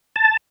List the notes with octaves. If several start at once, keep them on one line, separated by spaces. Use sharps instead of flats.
A5